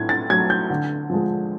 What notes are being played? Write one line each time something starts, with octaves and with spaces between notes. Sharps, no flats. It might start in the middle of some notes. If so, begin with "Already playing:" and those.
Already playing: A2 F#3 A3 G#6
A6
F#3 A3 G#6
G6
D3
F3 G#3